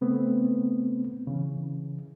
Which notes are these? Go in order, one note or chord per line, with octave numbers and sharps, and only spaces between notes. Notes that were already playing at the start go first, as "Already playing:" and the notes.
C#3 A3 B3 C4
C#3 E3